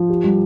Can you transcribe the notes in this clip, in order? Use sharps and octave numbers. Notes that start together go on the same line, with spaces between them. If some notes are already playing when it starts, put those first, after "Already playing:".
Already playing: F3
G4
G3